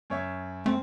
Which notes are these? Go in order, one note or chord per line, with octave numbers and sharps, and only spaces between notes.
F#2 C#5 E5
A3 C4